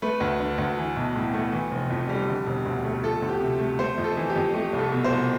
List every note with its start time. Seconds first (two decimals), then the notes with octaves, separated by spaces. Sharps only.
0.02 A3 B4
0.20 D2
0.40 D3
0.58 D2
0.77 E3
0.96 B1
1.16 A2
1.34 A3
1.52 E3
1.71 F1
1.90 F2
2.09 G3
2.28 D3
2.46 E1
2.65 D2
2.85 A3
3.04 F3 A4
3.22 D2
3.29 G4
3.40 C3
3.59 A3
3.79 A3 C5
3.98 F2
4.04 A4
4.17 E3
4.29 G4
4.36 F2
4.54 A3 G4
4.73 C2
4.78 A4
4.92 B2
5.04 C5
5.10 C2